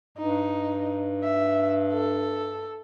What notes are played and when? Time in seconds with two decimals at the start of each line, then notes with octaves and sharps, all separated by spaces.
0.18 G2 D#4
1.24 E5
1.93 A4